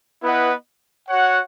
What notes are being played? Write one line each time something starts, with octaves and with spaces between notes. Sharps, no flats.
B3 E4 B4 D#5 F#5
F#4 C#5 F#5